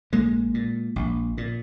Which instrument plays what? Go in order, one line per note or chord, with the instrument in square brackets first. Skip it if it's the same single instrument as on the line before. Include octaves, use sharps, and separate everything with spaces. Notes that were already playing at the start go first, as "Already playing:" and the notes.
[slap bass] A#1 G#3 A#3
A#2
A#1
A#2